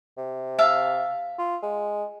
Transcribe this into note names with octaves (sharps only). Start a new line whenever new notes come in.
C3
E5 F5 A5
F4
G#3